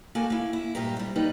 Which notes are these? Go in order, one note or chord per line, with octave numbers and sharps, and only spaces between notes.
A#3 F#4 A4 A#4 G5 G#5
A#3 E4
E4
G2 A#2 G4 B4 A#5
C3 G3
F#3 G3 A#3 D#4 B4